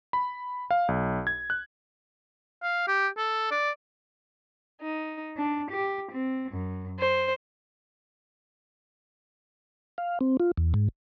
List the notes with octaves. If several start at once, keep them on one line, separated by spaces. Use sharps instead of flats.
B5
F5
B1
G#6
F#6
F5
G4
A4
D5
D#4
D4
G4
C4
F#2
C5
F5
C4
F4
E2
G#2